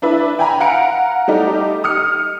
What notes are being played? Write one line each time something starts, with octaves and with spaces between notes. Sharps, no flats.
D4 E4 B4 E5
G5 G#5 A#5 B5
F5 F#5 A#5 C#7 D7
G3 A3 D#4 G4
D#6 F6 C#7